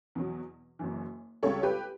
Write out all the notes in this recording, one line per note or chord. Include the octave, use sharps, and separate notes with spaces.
E2 B2 F#3
F#1 F#2 E3
C#2 C#3 G3 A4 C#5
G4 B4